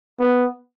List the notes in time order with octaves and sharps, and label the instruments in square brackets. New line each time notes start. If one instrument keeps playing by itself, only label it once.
[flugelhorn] B3